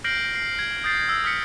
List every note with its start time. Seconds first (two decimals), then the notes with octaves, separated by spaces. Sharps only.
0.04 F6 G6 A#6 C7 D7 F#7
0.35 C7
0.59 G#6
0.84 D#6 G6 A6 C7
1.09 E6
1.24 D#6 F6 B6 C#7